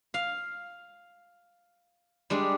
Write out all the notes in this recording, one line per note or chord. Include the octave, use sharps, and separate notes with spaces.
F5
G3 G#3 D4